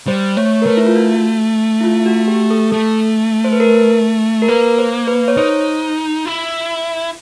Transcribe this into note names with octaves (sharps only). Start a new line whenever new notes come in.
G3 C5
A3 C#5
A#4
A3 B4
E4
F4
F#4
E4
F4
F#4
G4
A4
A3 A4
C5
B4
A#4
A#4
A#3 B4
C5
B4
C#5
D#4 C5
E4